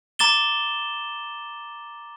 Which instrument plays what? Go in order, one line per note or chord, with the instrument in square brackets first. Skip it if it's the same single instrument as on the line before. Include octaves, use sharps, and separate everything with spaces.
[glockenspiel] A#5 D6 A6 E7 G7